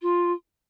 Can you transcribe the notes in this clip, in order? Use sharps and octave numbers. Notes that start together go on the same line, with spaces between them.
F4